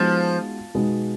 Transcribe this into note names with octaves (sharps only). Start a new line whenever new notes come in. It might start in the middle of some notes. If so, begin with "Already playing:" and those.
Already playing: F3 G#3 B3 D#4 F#4
B2 G#3 B3 D#4